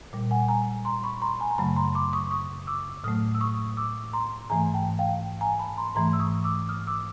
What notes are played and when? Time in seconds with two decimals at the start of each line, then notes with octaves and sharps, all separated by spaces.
0.13 A#2 G3
0.31 F#5 G#5
0.48 G#5 A#5
0.85 A#5 C6
1.04 B5 C#6
1.22 A#5 C6
1.40 G#5 A#5
1.51 A#5
1.58 F#2 C#3 F#3 A3 A5 B5
1.76 A#5 C6
1.95 C6 D6
2.13 C#6 D#6
2.31 C#6 D#6
2.67 D6 E6
3.04 A2 F#3 A3 D#6 F6
3.35 E6
3.41 C#6 D#6
3.77 D6 E6
4.13 A#5 C6
4.50 G#2 E3 A3 G#5 A#5
4.74 G5 A5
4.99 F5 G5
5.41 G#5 A#5
5.59 A5 B5
5.77 A#5 C6
5.96 G#2 E3 A3 A#5 C6
6.13 E6
6.20 C#6 D#6
6.44 D6 E6
6.69 D#6 F6
6.87 D6 E6